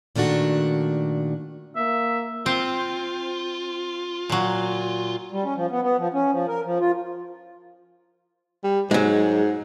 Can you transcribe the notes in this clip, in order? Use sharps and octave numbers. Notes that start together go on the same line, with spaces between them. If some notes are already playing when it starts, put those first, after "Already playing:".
A#2 D#3 A3 D4 F#4
A#3 E5
C4 F4
A#2 F#3
G3
C#4
F3
B3
B3
F3
C#4
F3
A#4
F3
F4
G3
G#2 F#3 G#3